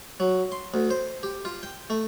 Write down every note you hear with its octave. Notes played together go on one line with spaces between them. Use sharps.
F#3
C6
D2
C5
G4
F4
G5
A3